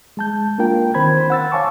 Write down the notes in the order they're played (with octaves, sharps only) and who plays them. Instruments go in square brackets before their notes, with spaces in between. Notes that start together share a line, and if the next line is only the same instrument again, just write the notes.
[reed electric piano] G#3 A5 G6
A#3 D4 F4 A#4 G5
D#3 C4 C5 B5 G#6
C5
F#5 E6 A6
C#5 F5 G#5 A5 C#6 D6